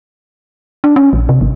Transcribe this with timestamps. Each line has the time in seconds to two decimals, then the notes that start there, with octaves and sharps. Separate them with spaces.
0.84 D4
0.96 C#4
1.13 A#1
1.29 C3
1.41 G#1